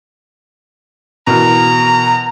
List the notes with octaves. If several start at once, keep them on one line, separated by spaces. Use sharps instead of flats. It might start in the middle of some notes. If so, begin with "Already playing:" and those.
B2 E3 A#4 A#5